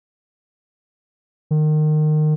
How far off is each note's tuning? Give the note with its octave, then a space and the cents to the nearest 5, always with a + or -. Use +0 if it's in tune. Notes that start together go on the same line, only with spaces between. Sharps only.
D#3 -25